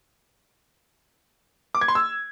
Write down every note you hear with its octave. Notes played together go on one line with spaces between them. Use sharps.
D6
G#6
C6
E6